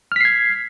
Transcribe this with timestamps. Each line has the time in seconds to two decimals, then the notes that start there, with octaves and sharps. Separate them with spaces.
0.12 F6
0.16 B6
0.21 C7
0.25 G#6